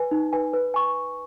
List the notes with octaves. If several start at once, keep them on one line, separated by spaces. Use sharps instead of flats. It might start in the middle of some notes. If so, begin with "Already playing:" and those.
Already playing: B4 G#5
D#4
B4 G#5
B4
G#5 C#6